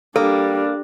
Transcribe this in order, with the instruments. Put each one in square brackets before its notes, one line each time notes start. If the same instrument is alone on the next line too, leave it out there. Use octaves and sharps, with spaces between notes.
[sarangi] G3 [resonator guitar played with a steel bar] A#3 [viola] D4 [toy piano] A4